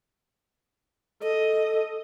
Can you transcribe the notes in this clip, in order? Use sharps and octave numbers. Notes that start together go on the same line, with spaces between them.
A4 D#5